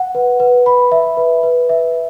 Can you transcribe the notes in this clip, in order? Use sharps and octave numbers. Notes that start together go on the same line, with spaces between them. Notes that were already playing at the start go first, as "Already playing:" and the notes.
Already playing: F#5
B4
B4
B5
E5
B4
B4
E5